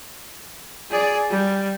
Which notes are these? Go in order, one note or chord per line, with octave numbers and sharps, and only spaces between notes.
G#4 D5
G3